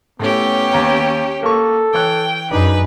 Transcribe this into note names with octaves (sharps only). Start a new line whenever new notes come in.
A2 A3 B3 C#4 G4
D#2 A#5
A#3 A4 C#6
E3 C#5 G5 F#6
F#2 D4 D#4 G#4 B4